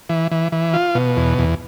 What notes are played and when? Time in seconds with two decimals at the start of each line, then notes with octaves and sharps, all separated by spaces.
0.09 E3
0.31 E3
0.52 E3
0.73 F4
0.95 B2
1.17 E2
1.38 E2